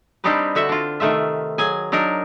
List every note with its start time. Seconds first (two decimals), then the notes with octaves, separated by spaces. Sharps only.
0.24 G3 C4 D4 D#4 G4 B4
0.55 D3 F#4 E5
0.69 D4 F4
1.00 C3 D#3 A3 F4 E5
1.58 F#3 G#4 G#5
1.92 F#3 D4 D#4 A#4